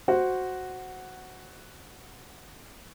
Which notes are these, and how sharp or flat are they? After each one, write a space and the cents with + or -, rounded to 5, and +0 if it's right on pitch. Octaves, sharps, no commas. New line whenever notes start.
F#4 +0 C5 +0